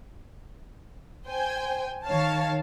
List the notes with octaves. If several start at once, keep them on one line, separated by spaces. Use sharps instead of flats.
C5 G5 G#5
D#3 C#5 F5 A5